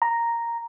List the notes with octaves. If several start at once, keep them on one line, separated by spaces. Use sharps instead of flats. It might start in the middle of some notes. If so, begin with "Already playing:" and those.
A#5